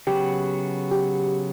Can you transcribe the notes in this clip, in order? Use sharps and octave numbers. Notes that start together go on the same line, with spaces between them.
C#3 F#3 B3 F#4 G4
G4